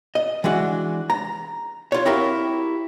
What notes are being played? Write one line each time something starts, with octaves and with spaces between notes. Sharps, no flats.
D#5
E3 G#3 D4 F#4
A#5
F4 C#5
C4 E4 F#4 G4 A#4 F5